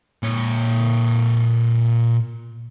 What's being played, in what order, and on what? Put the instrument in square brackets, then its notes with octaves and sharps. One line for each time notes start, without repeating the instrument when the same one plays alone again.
[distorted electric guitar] A#2 C#5